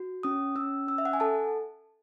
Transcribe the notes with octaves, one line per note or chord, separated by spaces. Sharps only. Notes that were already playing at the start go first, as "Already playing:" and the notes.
Already playing: F#4
C#4 D#6
C#4 E6
C#4 E6
E5
F#5
G#5
A4 A5